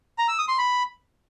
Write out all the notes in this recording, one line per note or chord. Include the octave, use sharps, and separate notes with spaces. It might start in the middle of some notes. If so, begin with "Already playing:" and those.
A#5
E6
D#6
C6
B5